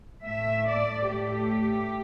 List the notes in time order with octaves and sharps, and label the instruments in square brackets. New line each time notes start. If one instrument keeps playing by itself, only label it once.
[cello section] A2 A3 E5
D5
A2 A3 G4